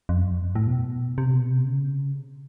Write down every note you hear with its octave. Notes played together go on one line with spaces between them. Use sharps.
F2
F#2
F2
F#2
A2
B2
C3
B2
C3
C#3